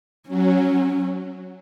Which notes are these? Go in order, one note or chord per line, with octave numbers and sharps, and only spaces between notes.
F#3 C#4